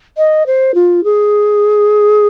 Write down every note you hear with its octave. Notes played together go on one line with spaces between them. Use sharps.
D#5
C5
F4
G#4